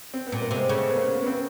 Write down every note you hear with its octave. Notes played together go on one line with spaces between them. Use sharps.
C4
B3
A#2
A#3
C3 G#3
C#3 A3
B3
A#3
B3
C4